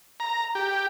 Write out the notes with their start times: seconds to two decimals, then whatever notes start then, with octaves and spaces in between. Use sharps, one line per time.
0.20 A#5
0.55 G4